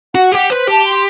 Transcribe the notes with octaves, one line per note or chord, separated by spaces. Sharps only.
F#4 F#5
G4 F#5
B4 C5
G4 A5
C6